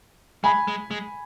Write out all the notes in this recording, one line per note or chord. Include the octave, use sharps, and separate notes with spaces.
G#3 G#5 B5
G#3
G#3